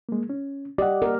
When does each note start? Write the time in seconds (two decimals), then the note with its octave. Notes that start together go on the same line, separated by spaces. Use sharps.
0.09 G#3 A#3
0.30 C#4
0.78 G4 D5 D#5 F#5
1.02 A#4